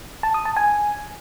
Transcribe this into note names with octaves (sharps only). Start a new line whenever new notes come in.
A5
D#6
A5
G#5